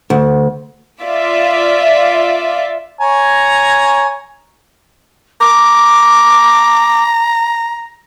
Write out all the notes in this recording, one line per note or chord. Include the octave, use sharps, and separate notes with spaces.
D2
F4 D5 E5
C#5 G#5 A#5
A#5 D6